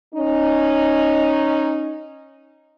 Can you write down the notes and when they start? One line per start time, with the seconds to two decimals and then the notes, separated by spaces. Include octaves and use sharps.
0.14 C#4 D#4